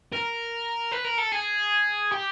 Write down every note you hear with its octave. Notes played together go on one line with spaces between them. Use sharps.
A#4
B4
A#4
A4
G#4
G4